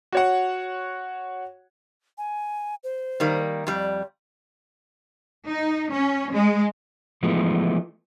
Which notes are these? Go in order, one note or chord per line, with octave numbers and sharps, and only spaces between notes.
F#4 C#5 F#5
G#5
C5
D#3 G3 A#3
F2 G3 D5
D#4
C#4
G#3
E3 F3 G#3 A3 B3